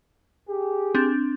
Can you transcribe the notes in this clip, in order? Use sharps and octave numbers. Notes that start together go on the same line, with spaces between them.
G4 G#4
C4 D4